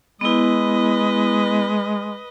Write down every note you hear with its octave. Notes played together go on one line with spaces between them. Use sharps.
G#3 B3 E4 B4 D#5